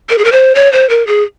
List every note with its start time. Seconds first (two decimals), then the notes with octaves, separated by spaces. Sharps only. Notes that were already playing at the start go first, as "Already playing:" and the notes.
0.09 A#4
0.18 G#4
0.25 A#4
0.32 C5
0.55 C#5
0.73 C5
0.89 A#4
1.07 G#4